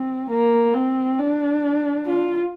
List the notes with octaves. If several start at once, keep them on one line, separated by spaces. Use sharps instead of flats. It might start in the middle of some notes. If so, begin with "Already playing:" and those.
Already playing: C4
A#3
C4
D4
F4